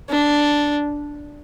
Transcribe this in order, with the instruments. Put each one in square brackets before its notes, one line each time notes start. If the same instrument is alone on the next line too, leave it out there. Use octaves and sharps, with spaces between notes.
[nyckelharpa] D4